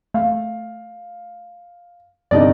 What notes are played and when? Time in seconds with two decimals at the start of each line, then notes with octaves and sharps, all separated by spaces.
0.14 A3 F5
2.31 G1 C3 D#4 D5 D#5